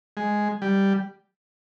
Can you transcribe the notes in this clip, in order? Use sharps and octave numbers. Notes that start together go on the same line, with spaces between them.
G#3
G3